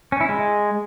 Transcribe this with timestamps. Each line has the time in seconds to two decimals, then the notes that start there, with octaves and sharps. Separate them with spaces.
0.12 C#4
0.21 E4
0.29 G#3